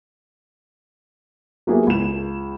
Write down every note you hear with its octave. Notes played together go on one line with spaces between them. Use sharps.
F#3 A#3 B3 E4 G4 G#4
C#2 E7